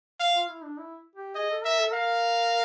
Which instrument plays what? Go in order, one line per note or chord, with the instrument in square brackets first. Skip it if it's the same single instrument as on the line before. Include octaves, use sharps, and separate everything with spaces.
[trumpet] F5
[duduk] F4
E4
D4
E4
G4
[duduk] G#4 [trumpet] D#5
[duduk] A4
[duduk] A#4 [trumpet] E5
[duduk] A4
[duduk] A#4 [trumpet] F5